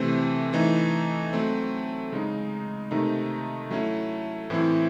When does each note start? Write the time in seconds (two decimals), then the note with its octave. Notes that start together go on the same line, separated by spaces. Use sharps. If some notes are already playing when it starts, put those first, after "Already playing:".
Already playing: C3 E3 A3 C4
0.53 E3 A3 D#4
1.33 F#3 A3 C4
2.12 C#3 G#3 D#4
2.91 C3 D#3 A3 D#4
3.70 F#3 A3 C#4 E4
4.50 A2 E3 C4 E4